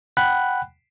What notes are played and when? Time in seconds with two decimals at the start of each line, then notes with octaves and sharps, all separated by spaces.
0.17 F#5 G5 B5 F#6